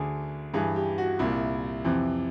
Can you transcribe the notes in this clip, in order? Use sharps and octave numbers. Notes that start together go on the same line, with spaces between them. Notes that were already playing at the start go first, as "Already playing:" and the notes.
Already playing: D2 D3 G#4
G2 E3 G#4
G4
F#4
C2 A#2 E4
F2 C3 E3